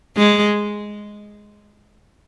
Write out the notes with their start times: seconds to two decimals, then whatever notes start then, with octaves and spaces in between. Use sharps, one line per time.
0.17 G#3